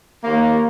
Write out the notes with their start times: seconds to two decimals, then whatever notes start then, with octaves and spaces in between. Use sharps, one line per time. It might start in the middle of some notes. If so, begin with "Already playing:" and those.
0.24 D#2 A#3